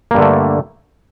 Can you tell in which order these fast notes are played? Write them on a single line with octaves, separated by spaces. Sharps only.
A#3 G2 D3 A3